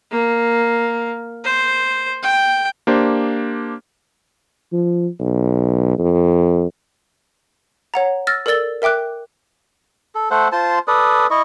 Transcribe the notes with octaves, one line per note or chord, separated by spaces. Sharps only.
A#3
C5
G5
A#3 D4 G4 C5
F3
B1
F2
C#5 F#5 A#5
E6 F6 A6 A#6
A4 A#4 D5 E6 A6 G7
A#4 E5 G5 D6 F#6
A4
A3 A4 C5 F#5
F4 C5 A5 C6
A4 B4 D5 D#6
E4 D#5 C#6